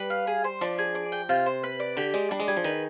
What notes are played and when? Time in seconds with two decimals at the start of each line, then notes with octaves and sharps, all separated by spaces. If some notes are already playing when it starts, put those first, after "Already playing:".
Already playing: G3 B4
0.10 F5
0.27 G#4
0.44 C5
0.61 F3 D4
0.78 G#4
0.95 D5
1.12 G5
1.29 C3 F4
1.46 C5
1.63 B4
1.80 D5
1.97 D3 G4
2.14 G#3 D5
2.31 G3 D4
2.40 G#3
2.48 G3 G#4
2.57 F3
2.64 D#3 B4